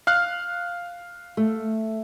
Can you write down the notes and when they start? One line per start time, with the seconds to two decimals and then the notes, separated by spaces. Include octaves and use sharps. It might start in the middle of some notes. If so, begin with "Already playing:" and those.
0.07 F5 F6 F#6
1.37 A3